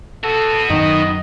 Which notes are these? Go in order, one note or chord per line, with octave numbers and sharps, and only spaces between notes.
B3 F#4 A4
F#2 D#3 D#5